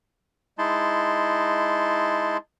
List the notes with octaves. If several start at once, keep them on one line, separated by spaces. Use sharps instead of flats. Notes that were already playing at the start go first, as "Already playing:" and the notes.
G#3 D#4 E4 A5 C6